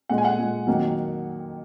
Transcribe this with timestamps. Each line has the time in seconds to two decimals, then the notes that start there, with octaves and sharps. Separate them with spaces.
0.09 A#2 G#3 F#5
0.18 G#5
0.25 F#5
0.38 A#2 G#3
0.67 F2 D#3 F#3 A#3